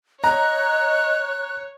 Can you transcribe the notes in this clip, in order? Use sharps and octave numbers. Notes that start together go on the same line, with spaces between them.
C#5 D#5 A#5 F#6